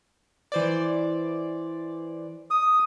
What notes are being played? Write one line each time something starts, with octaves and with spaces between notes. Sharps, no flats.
E3 C5 D5
D#6